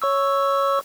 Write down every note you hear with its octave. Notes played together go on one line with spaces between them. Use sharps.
C#5 C#6 E6